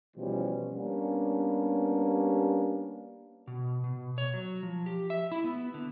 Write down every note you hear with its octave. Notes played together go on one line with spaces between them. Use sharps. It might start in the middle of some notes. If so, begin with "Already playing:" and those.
B2 E3 F3 G3 C#4
G3 A#3 B3 C#4 D4
B2
B2
C#5
F#3
F3
G4
E5
E4
B3
D3